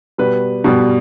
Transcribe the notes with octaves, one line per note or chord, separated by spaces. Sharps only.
B2 G3 B4
B2 G3